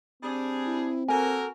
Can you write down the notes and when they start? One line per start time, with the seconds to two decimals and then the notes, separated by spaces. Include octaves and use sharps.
0.23 G3 C4 D4 G#4
0.66 E4
1.08 A#3 F#4 A4 A#4 G#5